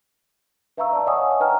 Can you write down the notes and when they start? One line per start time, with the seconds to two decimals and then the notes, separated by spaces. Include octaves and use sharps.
0.77 B4 E5 F5 A#5 C#6 E6
0.93 D5 A5
1.07 C#5 D#5 F#5 G#5 C#6 D#6
1.40 B4 G5 A#5 F6